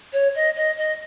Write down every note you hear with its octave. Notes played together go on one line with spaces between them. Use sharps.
C#5
D#5
D#5
D#5